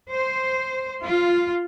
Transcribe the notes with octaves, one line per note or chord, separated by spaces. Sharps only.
C5
F4